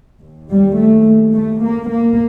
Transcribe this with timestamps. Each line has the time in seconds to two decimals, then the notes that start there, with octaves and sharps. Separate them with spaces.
0.21 D#2
0.50 G3
0.78 A3
1.34 A3
1.63 A#3
1.90 A#3